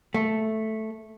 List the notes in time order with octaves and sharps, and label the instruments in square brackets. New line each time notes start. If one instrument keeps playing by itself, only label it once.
[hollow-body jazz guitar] A3